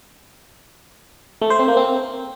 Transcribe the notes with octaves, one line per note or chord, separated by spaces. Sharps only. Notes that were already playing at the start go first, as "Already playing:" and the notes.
A3
C5
C4
A#3
C4